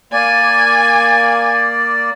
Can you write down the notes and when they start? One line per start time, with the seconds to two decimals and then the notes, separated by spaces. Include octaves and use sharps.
0.13 A#3 D5 G#5